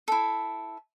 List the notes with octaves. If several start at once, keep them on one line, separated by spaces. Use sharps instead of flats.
E4 A4